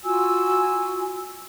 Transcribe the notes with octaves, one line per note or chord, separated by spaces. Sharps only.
F4 F#4 G#5 E6